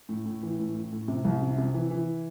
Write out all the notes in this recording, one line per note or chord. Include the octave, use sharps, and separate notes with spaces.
A2
A2
E3
A2
A2
A2
C3
C2
C3
C3
E3
E3